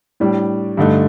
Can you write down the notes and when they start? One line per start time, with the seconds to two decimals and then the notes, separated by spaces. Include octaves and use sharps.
0.20 A2 G3 D4
0.77 G2 D3 A3 D#4